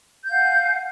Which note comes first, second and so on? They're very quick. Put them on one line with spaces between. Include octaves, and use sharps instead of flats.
G6 F5 F#5 G#5